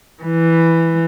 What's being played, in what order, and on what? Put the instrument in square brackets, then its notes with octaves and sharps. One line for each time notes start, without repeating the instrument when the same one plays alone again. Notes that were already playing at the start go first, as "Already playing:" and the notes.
[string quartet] E3